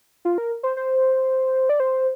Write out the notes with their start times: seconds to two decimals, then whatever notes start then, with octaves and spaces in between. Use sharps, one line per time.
0.25 F4
0.38 A#4
0.63 C5
0.77 C5
1.69 D5
1.80 C5